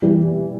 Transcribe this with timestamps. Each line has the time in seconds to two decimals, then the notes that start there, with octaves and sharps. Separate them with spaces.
0.02 E3 G3